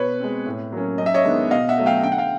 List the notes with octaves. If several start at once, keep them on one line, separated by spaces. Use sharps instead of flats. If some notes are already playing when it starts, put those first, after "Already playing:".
Already playing: B2 B4 C#5
G#3 C4
A2
F#3 A#3 C#4
F#2 D#5
E5
C#5 D#5
D#3 G#3 B3 D4
B2 D#5 F5
E5 F#5
F#3 A3
F5 G5
D3 G5
F#5
F5 G5